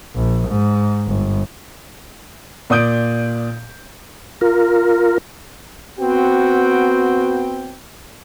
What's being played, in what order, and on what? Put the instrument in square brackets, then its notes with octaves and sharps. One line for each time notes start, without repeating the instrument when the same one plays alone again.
[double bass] A#1
G#2
G1
[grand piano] A#2 D5 D#6 G6 D7
[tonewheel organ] F4 A#4
[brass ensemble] B3 C4 F#4 G5